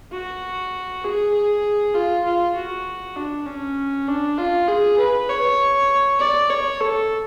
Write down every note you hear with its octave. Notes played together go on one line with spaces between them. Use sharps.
F#4
G#4
G#4
F4
F4
F#4
D4
C#4
D4
F4
G#4
B4
C#5
D5
C#5
A4